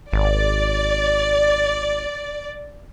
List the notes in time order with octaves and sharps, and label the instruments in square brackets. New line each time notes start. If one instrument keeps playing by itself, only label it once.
[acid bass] G#1 [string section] D5